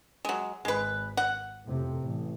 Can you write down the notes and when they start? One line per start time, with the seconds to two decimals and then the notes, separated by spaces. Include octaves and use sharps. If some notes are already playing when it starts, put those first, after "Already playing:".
0.25 F#3 G#3
0.65 G#1 G#3 B4
1.17 F#5
1.64 F2 A2 C3
2.03 A1